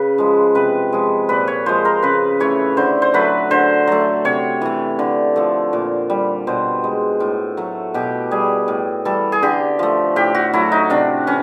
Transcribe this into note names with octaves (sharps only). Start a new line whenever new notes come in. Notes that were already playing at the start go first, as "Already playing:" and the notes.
Already playing: C#3 B4
F3 G#3
C3 B4
F3 G#3
A#2 B4
C#5
F3 G#3 C5
A#4
C#3 B4
E3 A3 C#5
D3 C5
C5
F#3 A3 B4
D3 C5
F#3 A3
C3 C#5
E3 A3
D3
F3 A3
A#2
G3
B2 C5
G#3
A2
F#3 A3
B2 G4
G3 G#4
A2
E3 G3 A4
G#4
D3 G4
F3 A3
A2 G4
F#4
F#3 A3 E4
D#4
C3 D4
E3 C#4